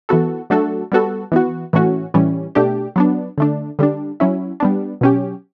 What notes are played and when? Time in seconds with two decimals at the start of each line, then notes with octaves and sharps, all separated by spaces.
0.09 E3 B3 F#4 A4
0.50 F#3 A3 D4 F#4 A4
0.92 G3 B3 F#4 A4
1.32 E3 B3 F#4
1.73 A2 E3 A3 C#4 F#4
2.14 A2 E3 G3 C#4
2.55 B2 A3 D4 G4
2.96 F#3 B3 D4
3.38 D3 A3 D4
3.79 D3 G3 D4
4.20 F#3 C#4 E4
4.60 G3 B3 D4
5.01 B2 F#3 C#4 G4